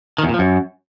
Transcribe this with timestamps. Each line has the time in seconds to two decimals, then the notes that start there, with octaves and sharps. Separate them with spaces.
0.18 D#3
0.24 E2
0.29 A#2
0.34 F3
0.39 F#2